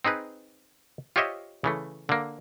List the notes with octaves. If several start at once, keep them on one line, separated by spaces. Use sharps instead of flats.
C4 D#4 G#4 B4
F4 G4 C5 C#5 D#5 E5
C#3 E3 A3
D3 A#3